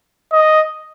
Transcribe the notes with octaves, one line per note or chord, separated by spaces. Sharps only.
D#5